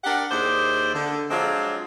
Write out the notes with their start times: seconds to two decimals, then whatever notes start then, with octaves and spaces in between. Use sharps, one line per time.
0.04 D4 G4 A#4 F#5
0.31 D#2 E4 G#4 C5 D5
0.93 D3
1.30 F3 F#3 G#3 C4 D4 F4